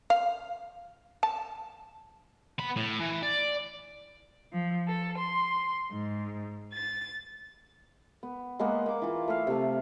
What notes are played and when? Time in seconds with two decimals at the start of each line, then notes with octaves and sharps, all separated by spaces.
0.10 F5
1.23 A5
2.59 B3 B5
2.76 A2
3.00 E3
3.23 D5
4.53 F3
4.87 A4
5.18 C6
5.91 G#2
6.72 A6
8.23 B3
8.59 G#3 A#3 B3 F#5
8.86 A#3 D6
9.02 E3 F4
9.28 A3 E5 F5
9.47 C3 A3